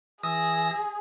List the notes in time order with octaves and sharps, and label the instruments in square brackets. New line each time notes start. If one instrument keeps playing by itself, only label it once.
[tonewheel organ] E3 E6 A#6 [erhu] G#4 [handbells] D#6